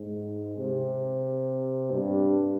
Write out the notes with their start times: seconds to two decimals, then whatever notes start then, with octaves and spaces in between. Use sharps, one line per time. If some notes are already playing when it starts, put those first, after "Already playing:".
Already playing: G#2
0.58 C3
1.91 G2